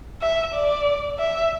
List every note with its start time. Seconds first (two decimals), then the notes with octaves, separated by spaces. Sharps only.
0.21 E5
0.54 D5
1.19 E5